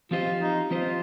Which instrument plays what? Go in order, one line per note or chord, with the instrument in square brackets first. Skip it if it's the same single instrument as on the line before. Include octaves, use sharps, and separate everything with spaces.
[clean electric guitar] F3 C4 G4 C5 D#5 [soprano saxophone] F4
[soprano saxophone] D#4
[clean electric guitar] F3 C4 G4 C5 D#5 [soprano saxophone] F4